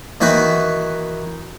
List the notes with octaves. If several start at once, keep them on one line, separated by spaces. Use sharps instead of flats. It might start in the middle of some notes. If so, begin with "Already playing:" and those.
D#3 E3 D#4 F#4 B4